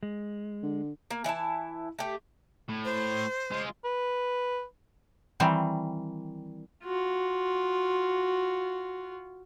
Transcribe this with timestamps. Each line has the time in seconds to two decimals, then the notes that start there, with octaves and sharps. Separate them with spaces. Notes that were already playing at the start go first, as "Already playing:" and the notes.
0.03 G#3
0.63 D3
1.11 A#3
1.24 E3 E4 D#5 A5
1.99 A3 G4
2.69 A2
2.85 C5
3.52 G#3 F4
3.85 B4
5.40 D#3 E3 G3 C4
6.84 F4 F#4